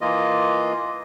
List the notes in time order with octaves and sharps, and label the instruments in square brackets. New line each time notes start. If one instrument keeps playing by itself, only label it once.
[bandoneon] E3 A#3 F4 D#5